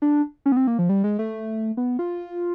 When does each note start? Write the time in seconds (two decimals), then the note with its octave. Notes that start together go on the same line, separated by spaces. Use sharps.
0.02 D4
0.46 C#4
0.52 B3
0.57 C4
0.67 A#3
0.79 F3
0.89 G3
1.04 G#3
1.19 A3
1.77 B3
1.99 F4